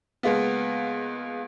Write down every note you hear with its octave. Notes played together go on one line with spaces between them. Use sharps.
C#2 G#3 A#3 B3